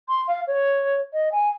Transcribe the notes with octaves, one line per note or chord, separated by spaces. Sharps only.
C6
F5
C#5
D#5
G#5